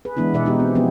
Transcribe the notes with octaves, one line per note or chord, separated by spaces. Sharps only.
G#4 B4
E3 G#3 B3 D4 E4
B2 G#4 D5 E5 F#5
G#3 D#4 G4
C4
F3 B3 C#4 E4 G4 G#4